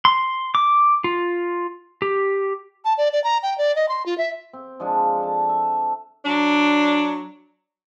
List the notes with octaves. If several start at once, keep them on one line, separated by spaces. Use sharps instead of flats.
C6
D6
F4
G4
A5
D5
D5
A#5
G5
D5
D#5
C6
F4
E5
C4
F3 G#3 D4 F4
A4 A5
E5
F#3 D4